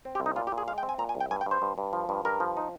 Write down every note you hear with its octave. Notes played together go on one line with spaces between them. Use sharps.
C4
G4
C2
D#4
A#2 F4
G4
A#2
G#4
G#3 F5
G5
C4
G#5
A#2 A#5
G#5
C2
G5
G2 G#5
G5
G2 C5
G2
G2
F3
G2
G2 A#4
F3
D#4